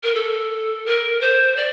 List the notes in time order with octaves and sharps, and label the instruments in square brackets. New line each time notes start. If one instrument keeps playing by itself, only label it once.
[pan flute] A#4
A4
A#4
C5
D5